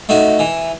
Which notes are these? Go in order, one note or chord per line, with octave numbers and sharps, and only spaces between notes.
A3 D#4 F#4
E3